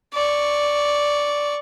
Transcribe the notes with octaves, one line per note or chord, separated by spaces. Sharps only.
D5 C#6